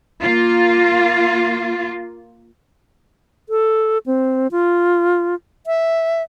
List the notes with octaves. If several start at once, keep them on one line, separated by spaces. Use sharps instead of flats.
A#3 F4
A4
C4
F4
E5